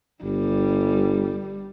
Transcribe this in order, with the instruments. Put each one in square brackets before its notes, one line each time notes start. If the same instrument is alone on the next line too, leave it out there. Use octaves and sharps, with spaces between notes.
[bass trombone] G1 [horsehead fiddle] G3